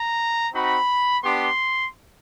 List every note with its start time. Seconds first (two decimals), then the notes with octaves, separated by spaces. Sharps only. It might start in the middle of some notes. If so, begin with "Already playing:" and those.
Already playing: A#5
0.53 C4 D#4 F#4 B5
1.23 B3 D4 G4 C6